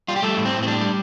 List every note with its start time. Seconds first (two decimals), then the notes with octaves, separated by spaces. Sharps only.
0.08 G3 F4
0.16 G4
0.22 G3 A3 A4
0.37 A2
0.45 C4
0.52 A2
0.63 C4
0.67 G3 D4
0.81 G3